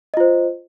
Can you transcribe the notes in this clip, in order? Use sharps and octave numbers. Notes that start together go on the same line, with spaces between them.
F4 C5 D#5